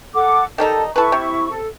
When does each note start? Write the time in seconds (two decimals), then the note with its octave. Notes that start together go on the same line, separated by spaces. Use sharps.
0.14 A4 F#5 D6
0.58 D#3 G3 D#4 A4 A5
0.96 E4 A4 B4 C#6
1.12 C3
1.50 A4